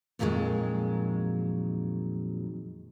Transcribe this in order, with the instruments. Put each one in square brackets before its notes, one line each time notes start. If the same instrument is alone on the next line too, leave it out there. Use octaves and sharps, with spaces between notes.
[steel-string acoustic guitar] F2 A#2 D#3 F#3 G#3